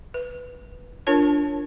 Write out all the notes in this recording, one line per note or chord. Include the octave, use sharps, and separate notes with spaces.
B4
D4 F4 A#4 C#5 A5